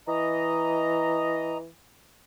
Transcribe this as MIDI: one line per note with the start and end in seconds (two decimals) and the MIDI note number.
0.08 1.67 52
0.08 1.57 75
0.08 1.57 82